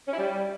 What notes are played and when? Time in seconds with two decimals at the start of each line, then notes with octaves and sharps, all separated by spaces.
0.07 C#4
0.12 E4
0.18 G3